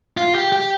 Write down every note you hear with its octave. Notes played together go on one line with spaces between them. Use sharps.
F4
G4
G4